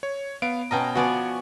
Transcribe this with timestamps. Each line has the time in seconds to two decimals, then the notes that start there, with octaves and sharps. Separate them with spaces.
0.03 C#5
0.42 B3 F5 D7
0.71 B2 C#4 D#5 G5 A5 A#5
0.95 F3 B3 F#4 D5 G#5 C#6